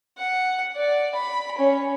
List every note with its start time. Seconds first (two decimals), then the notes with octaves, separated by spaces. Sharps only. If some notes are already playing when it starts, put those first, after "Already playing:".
0.18 F#5
0.76 D5
1.15 B5
1.58 C#4